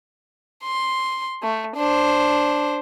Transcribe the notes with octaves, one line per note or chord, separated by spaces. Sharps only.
C6
A3
D4 C5